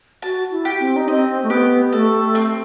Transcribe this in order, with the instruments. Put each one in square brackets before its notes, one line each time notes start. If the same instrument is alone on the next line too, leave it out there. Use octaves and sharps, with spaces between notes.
[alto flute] F#4 [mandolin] A5
[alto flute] E4
[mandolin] G4
[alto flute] C4
D#4
[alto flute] C4 [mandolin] D#5
[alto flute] A3
[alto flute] B3 [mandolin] G4
[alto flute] A3 [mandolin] A4
[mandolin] C4